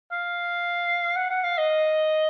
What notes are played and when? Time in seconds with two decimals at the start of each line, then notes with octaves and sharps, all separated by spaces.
0.12 F5
1.16 F#5
1.30 F#5
1.44 F5
1.58 D#5